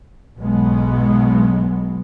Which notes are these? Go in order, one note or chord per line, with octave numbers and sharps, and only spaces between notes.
B1 G#2 B2 F#3 G#3 B3